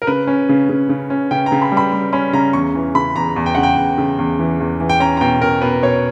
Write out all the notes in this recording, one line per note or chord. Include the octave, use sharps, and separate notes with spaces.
A#4
C#3 B4
C#4
C#3
C#3
C#3
C#4
C#3 G5
A#5
C#3
B5
G3
B5
G3
C#4 B5
C#3 A#5
E2 C#6
E3
C#3 B5
E2 A#5
E2
G5
C#3 F#5
G5
E2
C#3
E2
E3
E2
E3
G5
C#4 A#5
A#5
B2 G5
B2 A#4
B2 B4
B2 C#5